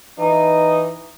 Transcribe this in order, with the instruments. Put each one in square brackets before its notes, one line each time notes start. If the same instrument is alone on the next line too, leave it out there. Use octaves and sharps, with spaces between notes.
[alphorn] E3 [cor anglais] D#4